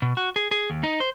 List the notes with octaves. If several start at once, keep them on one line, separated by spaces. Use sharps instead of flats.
B2
F#4
G#4
G#4
D#2
D#4
C5